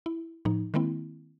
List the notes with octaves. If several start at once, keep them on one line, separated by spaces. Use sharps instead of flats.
E4
A2 F3 D#4
D#3 G#3 A#3 C4 E4